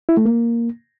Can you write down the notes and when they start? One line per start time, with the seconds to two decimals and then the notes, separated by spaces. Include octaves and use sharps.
0.09 E4
0.17 A3
0.25 A#3